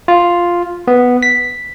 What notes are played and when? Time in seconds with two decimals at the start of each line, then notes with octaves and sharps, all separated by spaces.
0.08 F4
0.87 B3
1.23 B6